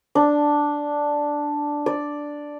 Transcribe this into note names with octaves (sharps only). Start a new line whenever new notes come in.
D4
D5